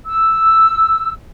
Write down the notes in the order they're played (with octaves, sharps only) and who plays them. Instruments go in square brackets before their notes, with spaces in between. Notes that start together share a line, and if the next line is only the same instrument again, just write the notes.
[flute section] E6